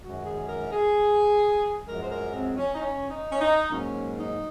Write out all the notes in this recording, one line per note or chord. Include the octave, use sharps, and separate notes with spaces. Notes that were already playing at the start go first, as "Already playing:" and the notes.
F#2 D#3 G#3 F#4
G#4
A#4
G#4
F#2 F3 G#3 A#4
C5
A#4
C4
C#4
D#4
C#4
D#4
C#4
D#4
G#2 F#3 A#3 C#4
D#4